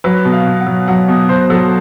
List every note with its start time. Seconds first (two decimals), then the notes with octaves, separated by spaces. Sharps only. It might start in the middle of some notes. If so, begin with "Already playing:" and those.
0.04 F#3 B4
0.25 B2
0.32 F5
0.47 B2
0.60 F#5
0.66 F#3
0.88 F#3 F#5
1.08 B2
1.29 B2 C5
1.50 F#3 A4